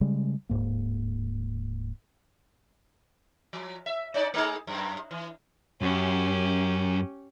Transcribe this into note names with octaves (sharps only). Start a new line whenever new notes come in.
C#3 G3 G#3
D1 E2 G#2 A#3
F3
E5
C#4 D#4 D5
A3 D#4 G#4
F#2
E3
F#2 C#4 G4